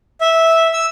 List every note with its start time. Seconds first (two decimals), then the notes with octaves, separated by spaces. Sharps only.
0.21 E5
0.73 E6